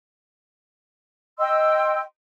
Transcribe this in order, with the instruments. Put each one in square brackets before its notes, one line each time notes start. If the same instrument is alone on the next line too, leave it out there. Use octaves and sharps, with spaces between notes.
[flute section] D#5 G5 C6 E6